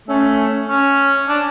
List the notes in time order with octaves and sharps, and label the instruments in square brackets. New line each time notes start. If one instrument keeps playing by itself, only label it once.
[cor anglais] A3 [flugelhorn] C#4
[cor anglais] C#4
D4